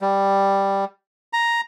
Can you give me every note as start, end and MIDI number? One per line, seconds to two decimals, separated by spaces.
0.01 0.85 55
1.33 1.61 82